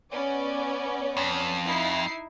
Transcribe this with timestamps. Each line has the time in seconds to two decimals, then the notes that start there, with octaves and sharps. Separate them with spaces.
0.10 B3 C#4 D5
1.17 F2
1.65 D#4 E4 C7